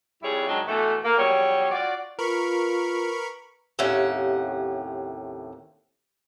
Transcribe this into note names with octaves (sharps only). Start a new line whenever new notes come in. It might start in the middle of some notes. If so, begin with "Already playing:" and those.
F2 G3 E4 G#4 C#5
G#2 D#3 F#3 D4
B2 E3 A3
A#3
E2 F#3 G3 C#5
F4 F#4 D5
F4 A#4 B4 B5 C#6
D#2 A2 C3 C#4 F#5